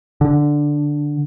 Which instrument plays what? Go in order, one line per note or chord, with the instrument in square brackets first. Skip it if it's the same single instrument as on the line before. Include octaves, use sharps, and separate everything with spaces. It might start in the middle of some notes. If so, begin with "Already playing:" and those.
[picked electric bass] D3